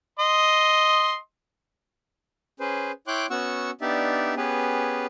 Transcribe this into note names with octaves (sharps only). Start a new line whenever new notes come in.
D#5 C6
C#4 G#4 B4 C5
E4 C#5 G5 C6 D6 F#6
B3 C#4 F#4 F#5 C#6 E6
B3 D4 D#4 G4 D5 E5
B3 C#4 G4 G#4 B4